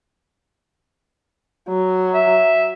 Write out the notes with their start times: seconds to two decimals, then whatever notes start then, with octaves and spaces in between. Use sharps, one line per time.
1.69 F#3
2.14 E5